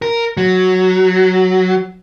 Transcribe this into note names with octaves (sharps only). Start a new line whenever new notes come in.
A#4
F#3